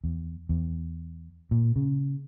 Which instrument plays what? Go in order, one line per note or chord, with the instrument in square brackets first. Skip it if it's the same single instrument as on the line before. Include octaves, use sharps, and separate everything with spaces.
[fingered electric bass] E2
E2
A#2
C#3